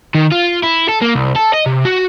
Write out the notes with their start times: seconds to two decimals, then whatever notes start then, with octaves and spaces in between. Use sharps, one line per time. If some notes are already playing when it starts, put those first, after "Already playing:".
0.15 D#3
0.32 F4
0.63 E4
0.89 A4
1.02 A#3
1.15 C2
1.36 A4
1.53 D#5
1.66 C3
1.85 F#4